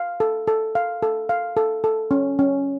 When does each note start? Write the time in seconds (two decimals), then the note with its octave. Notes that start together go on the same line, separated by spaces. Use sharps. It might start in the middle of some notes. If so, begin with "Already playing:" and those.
Already playing: F5
0.20 A4
0.47 A4
0.75 F5
1.03 A4
1.29 F5
1.57 A4
1.84 A4
2.11 C#4
2.39 C#4